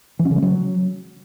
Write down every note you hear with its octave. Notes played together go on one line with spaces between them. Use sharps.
E3
C#4
C#3
G#3
F#3